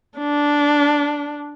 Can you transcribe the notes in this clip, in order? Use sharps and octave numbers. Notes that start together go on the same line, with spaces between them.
D4